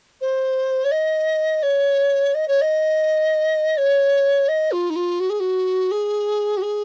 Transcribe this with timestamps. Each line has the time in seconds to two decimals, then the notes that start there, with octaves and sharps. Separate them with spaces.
0.21 C5
0.84 C#5
0.91 D#5
1.63 C#5
2.34 D#5
2.48 C#5
2.61 D#5
3.77 C#5
4.48 D#5
4.72 F4
4.90 D#4
4.96 F4
5.20 F#4
5.30 G#4
5.40 F#4
5.91 G#4
6.57 F#4
6.62 G#4